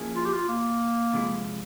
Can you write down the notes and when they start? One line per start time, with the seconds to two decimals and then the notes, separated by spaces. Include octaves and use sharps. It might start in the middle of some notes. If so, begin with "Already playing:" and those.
Already playing: F3 A#3 C#4 E4 G#4
0.16 F4
0.25 G4
0.33 F4
0.48 A#3
1.14 C3 F3 G#3 E4